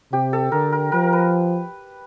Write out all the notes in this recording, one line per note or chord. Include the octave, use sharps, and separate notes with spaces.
C3 G4
A4
D3 A#4
A#4
F3 A#4
B4